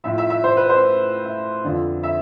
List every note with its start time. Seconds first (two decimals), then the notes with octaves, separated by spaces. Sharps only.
0.04 A2 F3 E5
0.18 E5
0.30 E5
0.44 C5
0.57 B4
0.69 C5
1.24 E5
1.64 F2 D3 F3
2.03 E5